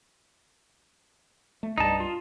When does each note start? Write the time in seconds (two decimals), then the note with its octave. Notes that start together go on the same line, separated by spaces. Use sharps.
1.63 A3
1.78 C2 G2 G3 D#4 A5
2.00 F4